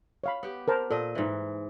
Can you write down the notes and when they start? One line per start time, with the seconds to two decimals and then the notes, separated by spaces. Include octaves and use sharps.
0.24 C#5 F5 B5
0.43 B3 G4
0.68 A#4 C5 A5
0.91 A#2 A4 D#5
1.15 G#2 E3